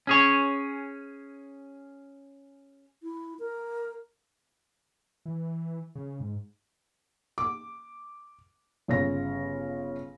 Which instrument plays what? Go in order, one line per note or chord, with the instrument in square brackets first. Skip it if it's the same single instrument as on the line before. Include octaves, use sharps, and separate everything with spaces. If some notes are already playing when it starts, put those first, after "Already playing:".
[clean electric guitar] C#4 G#4 C#5
[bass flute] E4
A#4
[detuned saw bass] E3
C#3
G#2
[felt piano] D6
G1 C#3 C#5 A#6